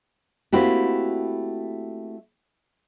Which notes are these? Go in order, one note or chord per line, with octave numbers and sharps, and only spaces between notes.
A3 A#3 C4 E4 F#4 G4